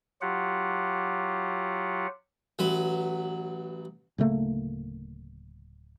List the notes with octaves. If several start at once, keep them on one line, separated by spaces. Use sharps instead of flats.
F#3 F4 G4 F#5
A1 F#3 B4
D1 C#3 A3 A#3